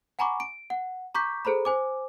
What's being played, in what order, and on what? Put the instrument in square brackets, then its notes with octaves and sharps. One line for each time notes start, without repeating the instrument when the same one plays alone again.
[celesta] F#5 G#5 A#5 B5 C#6 D6
D7
F#5
A#5 C#6 D6 G6 B6
G#4 A4 C5 A#5 B5
C5 G#5 D6